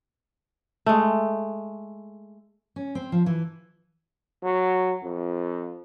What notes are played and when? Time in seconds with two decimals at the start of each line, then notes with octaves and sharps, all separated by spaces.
0.86 G#3 A3
2.76 C#4
2.95 C4
3.12 F3
3.26 E3
4.43 F#3
5.03 F2